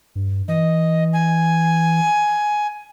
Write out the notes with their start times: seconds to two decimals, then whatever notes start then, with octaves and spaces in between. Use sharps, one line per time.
0.15 G2
0.48 E3 D#5
1.13 G#5